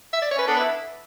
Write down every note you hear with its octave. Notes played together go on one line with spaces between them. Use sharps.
E5
D5
C#5
C#4 B4
B3 D4 A4
B4
E4